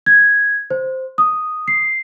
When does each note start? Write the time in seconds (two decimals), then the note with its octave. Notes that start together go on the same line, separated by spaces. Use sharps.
0.06 G#6
0.71 C5
1.18 D#6
1.68 C7